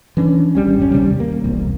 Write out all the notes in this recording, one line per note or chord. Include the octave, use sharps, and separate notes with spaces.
E3 C#4 D4
G#1 G3 C#4
F1 C#4
D#2 C3 G3
A#3
E1 C2